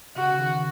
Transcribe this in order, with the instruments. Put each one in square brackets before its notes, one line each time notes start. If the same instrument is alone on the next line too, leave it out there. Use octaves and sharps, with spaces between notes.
[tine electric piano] C#3 [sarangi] F#4
[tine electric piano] C#3
D#3
D#3